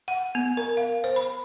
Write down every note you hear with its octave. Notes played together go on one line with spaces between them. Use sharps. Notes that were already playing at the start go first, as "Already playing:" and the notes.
F#5
B3
A#4
F5
C5
B5